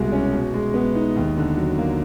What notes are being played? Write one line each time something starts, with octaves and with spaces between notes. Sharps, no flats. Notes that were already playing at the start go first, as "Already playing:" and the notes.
Already playing: C2 B2 G#3
C#4
B2
G#3
B3
D#4
D#2
D3
F#3
A#3